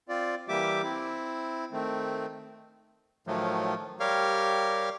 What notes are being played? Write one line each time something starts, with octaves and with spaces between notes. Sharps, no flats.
C4 F4 D5
E3 G3 A#3 G4 E5 D6
C4 E4
D#3 A3 C4
A2 D#3 F3 F#3 A3
G3 G4 A#4 C#5 F5 F6